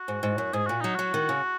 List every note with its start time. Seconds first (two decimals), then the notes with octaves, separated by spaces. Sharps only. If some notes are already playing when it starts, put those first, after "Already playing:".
Already playing: F#4
0.08 G#2
0.23 G#2
0.38 F#2
0.53 G#2 G#4
0.67 A#2 F#4
0.80 F#3 D#4
0.95 F#3 F#4
1.14 D#3
1.29 C#3